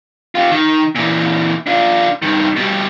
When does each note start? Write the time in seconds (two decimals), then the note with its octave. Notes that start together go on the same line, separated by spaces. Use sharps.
0.35 F4 G4
0.51 D#3
0.95 A#2 E3
1.67 D4 F4
2.22 G2 D#3
2.56 B2 G3